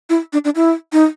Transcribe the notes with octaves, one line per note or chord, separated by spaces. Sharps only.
E4
D4
D4
E4
D#4